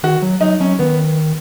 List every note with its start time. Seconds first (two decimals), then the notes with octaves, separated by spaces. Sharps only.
0.03 D#3 F#4
0.22 F#3
0.41 F#3 D#4
0.60 F#3 C#4
0.79 D#3 B3